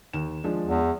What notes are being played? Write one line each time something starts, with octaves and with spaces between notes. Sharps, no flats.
D#2 E7
F3 G#3 D4
E2